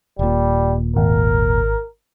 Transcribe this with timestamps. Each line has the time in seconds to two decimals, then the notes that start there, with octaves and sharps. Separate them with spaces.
0.19 D#1 A#2 G3
0.97 G#1 A#4